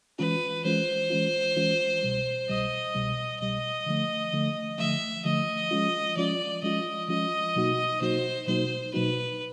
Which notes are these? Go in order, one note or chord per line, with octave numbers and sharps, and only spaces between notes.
E3 G#3 C#4 F4 B4
E3 G#3 C#4 F4 C5
E3 G#3 C#4 F4
E3 G#3 C#4 F4
C2 B2 G3
C2 B2 G3 D#5
C2 B2 G3
C2 B2 G3 D#5
D3 F3 A3
D3 F3 A3
D3 F3 A3 E5
D3 F3 A3 D#5
F3 G#3 C#4 F4
F3 G#3 C#4 F4 D5
F3 G#3 C#4 F4 D#5
F3 G#3 C#4 F4 D#5
B2 F#3 A#3 D#4 F#4
B2 F#3 A#3 D#4 F#4 C5
B2 F#3 A#3 D#4 F#4 C5
B2 F#3 A#3 D#4 F#4 B4